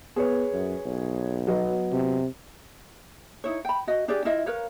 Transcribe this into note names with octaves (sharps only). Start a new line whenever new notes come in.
B3 G#4 B4 C#5
F#2
B1
F#3 B3 D#5
C3
D#4 E4 C#5
G5 B5
F#4 D#5
D4 G4 G#4 D5
E4 F4 D#5 E5
A#4 B4 C#5 F5